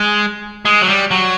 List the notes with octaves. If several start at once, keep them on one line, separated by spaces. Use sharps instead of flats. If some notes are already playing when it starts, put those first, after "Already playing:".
Already playing: G#3
G#3
F#3
G3
F#3